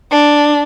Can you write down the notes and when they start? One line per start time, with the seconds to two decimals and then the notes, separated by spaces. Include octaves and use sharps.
0.11 D4